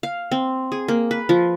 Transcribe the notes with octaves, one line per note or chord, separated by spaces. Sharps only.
F5
C4
G#4
A#3
B4
F3